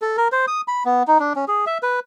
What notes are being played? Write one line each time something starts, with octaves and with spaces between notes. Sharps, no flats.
A4
A#4
C5
D#6
B5
B3
D#4
D4
C#4
G#4
E5
B4